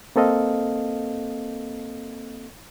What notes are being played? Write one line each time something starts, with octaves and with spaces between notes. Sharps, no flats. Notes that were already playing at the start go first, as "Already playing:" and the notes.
A#3 C4 A4 D#5 F5